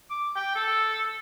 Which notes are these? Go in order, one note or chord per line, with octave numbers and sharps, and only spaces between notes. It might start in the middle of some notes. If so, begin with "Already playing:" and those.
D6
G5
A4